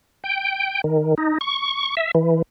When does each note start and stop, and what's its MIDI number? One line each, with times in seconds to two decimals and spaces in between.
0.24 0.81 79
0.84 1.15 51
1.18 1.38 63
1.41 1.95 85
1.97 2.11 76
2.15 2.42 52